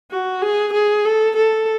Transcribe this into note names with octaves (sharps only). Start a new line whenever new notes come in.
F#4
G#4
G#4
A4
A4